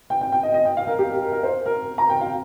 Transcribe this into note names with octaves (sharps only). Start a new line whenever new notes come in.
G5
G5
G5
D#5
D#5
G5
F5
A#4
G4
A#4
A#4
A#4
C5
A#4
A#5
G5
F5